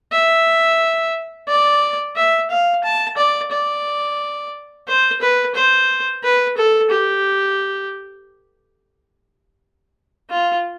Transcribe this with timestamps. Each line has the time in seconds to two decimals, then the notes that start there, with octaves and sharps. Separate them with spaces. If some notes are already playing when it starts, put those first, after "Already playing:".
0.12 E5
1.48 D5
2.16 E5
2.50 F5
2.84 A5
3.17 D5
3.52 D5
4.88 C5
5.21 B4
5.55 C5
6.23 B4
6.57 A4
6.90 G4
10.30 F4